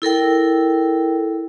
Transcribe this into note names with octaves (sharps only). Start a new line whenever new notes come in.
E4 A4 A#4 G5